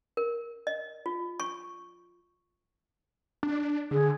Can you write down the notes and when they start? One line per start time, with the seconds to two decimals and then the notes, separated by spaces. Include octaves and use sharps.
0.17 A#4
0.67 D#5
1.06 F4
1.40 C#6
3.43 D4
3.91 D3 G#4